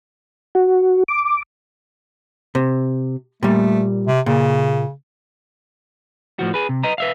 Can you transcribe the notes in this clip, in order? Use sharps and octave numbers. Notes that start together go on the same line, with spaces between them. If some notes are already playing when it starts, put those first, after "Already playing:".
F#4
D6
C3
A#2 G3 A3
C3
A#2 C#3
A2 F3 F#4
G#4 B4
C3
B4 D#5 A#5
B4 E5 F5